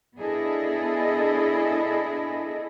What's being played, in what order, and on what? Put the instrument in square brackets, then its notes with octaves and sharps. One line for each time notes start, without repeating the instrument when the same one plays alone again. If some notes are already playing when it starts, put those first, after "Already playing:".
[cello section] B3 D4 E4 G#4 A4 D#5